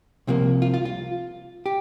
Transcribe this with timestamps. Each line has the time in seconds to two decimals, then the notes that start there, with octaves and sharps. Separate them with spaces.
0.27 C2 C3 F3 A#3
0.62 F4
0.74 F4
0.85 F4
1.66 G4